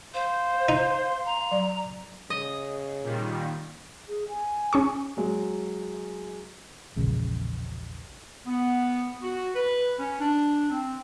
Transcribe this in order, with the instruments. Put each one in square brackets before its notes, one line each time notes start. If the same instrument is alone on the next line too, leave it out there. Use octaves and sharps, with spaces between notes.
[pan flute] C5 [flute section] F5 C6
[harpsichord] D#4
[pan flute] A#5
[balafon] F#3 D5
[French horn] C#3 [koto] D#5
[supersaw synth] A#2 D#3 G3
[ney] G#4
G#5
[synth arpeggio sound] C#4 G#4 C#6
[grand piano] F#3 G#3
[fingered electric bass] E1 A#1 C#3 G#3
[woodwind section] B3
F#4
B4
C#4
D4
C4